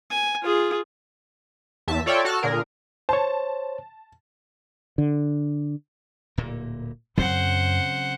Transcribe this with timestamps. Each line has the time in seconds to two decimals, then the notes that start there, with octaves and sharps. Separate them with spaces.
0.11 G#5
0.43 F4 G#4
1.88 E2 E5 A5 B6
2.06 F4 A4 C#5 D5 E5 G5
2.25 F#4 A4 A5 F6 F#6
2.43 A#2 D3 G#4 A#4
3.09 C5 C#5 A5
4.98 D3
6.37 D1 A#2 A#3
7.18 F#2 C#3 F#3 C4 C5 F#5